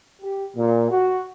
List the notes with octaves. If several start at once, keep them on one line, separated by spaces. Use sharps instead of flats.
G4
A#2
F#4